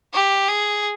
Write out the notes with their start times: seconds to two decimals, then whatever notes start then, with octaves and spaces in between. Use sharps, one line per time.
0.14 G4
0.48 G#4